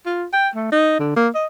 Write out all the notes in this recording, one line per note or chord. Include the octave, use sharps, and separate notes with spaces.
F4
G5
A3
D#4
D3
A#3
D#5